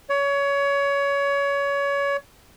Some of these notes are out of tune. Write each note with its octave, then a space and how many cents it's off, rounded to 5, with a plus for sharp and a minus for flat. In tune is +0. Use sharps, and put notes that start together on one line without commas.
C#5 +25